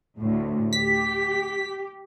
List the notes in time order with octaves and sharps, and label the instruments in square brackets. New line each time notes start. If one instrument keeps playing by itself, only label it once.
[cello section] D2 A2
[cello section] G4 [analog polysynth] B6